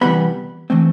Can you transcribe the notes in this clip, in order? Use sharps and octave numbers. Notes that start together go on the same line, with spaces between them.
C3 E3 G3 B3 B5
E3 A3 C4